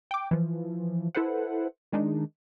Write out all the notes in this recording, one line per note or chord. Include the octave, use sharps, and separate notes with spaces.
G5 D6
E3 F3
E4 A4 B4 C5 F#5
D#3 G#3 D4 D#4